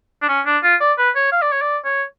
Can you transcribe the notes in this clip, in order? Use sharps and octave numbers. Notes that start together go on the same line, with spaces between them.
D4
C#4
D4
F4
D5
B4
C#5
F5
D5
C#5
D5
C#5